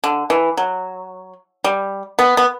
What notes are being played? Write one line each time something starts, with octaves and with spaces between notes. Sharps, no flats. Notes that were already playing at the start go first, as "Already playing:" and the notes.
D3
E3
F#3
G3
B3
B3